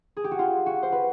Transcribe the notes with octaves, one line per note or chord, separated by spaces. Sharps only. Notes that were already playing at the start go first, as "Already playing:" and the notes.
G#4
G4
F#4
F4
F#4
C5
B4